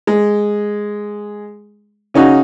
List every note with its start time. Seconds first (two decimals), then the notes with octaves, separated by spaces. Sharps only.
0.07 G#3
2.14 C#3 C#4 D#4 F#4